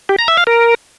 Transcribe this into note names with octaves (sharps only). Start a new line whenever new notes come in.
G4
A#5
E5
F5
A#4